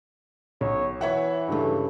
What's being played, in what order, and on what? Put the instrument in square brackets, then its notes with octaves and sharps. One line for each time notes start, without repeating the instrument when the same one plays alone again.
[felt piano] B1 [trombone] C#5
[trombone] E3 [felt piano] C#5 E5 F#5
[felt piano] G2 C#3 A3